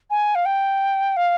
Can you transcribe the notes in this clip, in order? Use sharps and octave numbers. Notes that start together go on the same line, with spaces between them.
G#5
F5
G5
F5